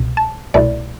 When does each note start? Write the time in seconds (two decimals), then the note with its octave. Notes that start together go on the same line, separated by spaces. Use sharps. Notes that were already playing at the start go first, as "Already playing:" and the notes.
Already playing: C2 B2
0.17 A5
0.54 C2 B2 A3 E4 D5